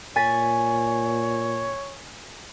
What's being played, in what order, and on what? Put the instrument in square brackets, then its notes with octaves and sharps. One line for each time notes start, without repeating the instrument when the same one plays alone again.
[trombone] A#2 [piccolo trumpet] C#5 [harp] G#5 A6 B6